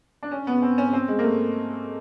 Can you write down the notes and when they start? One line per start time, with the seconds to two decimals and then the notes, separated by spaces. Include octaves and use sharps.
0.23 D4
0.31 C#4
0.47 B3
0.62 C4
0.78 C#4
0.93 C4
1.08 G#3
1.19 A#3
1.24 A3